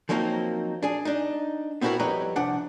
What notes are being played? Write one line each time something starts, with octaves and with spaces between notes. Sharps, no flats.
F3 F#3 A#3 C4 D#4
D4 G#4
D4 D#4
B3 C4 D4 E4 F#4 A#4
F2 G3 B4 C#5 D#5 A#5
C2 F3 D4 F#5